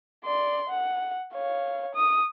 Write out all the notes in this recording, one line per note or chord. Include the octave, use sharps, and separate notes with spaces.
D5 C6
F#5
C#5 F5
D#6